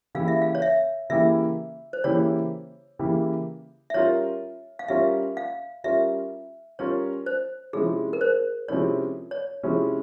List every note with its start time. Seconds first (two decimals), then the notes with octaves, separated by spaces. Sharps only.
0.15 C#3 E3 A#3 E4 G4 F5
0.28 E5
0.42 F5
0.55 C#5
0.62 E5
1.10 C#3 E3 A#3 E4 G4 E5
1.93 C5
2.04 C#3 E3 A#3 E4 G4 C#5
2.99 C#3 E3 A#3 E4 G4
3.90 E5
3.94 G3 C#4 F4 A#4 C#5
4.79 F5
4.88 G3 C#4 F4 A#4 E5
5.37 F5
5.84 G3 C#4 F4 A#4 E5
6.79 G3 C#4 F4 A#4 C#5
7.26 C5
7.73 C3 F3 G#3 C#4 E4 G#4
8.13 A#4
8.21 C5
8.68 C3 F3 G#3 C#4 E4 C#5
9.31 C#5
9.63 C3 F3 G#3 C#4 E4